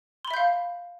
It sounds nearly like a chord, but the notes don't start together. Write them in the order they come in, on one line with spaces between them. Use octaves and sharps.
C6 B5 E5 G6 F5